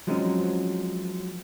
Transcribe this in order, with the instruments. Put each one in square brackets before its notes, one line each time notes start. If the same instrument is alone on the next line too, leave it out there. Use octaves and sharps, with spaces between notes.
[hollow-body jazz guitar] F3 F#3 G#3 C4 C#4 D#4